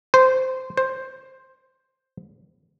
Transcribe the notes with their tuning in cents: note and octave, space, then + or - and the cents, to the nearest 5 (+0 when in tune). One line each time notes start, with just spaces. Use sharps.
C5 -15
C5 +5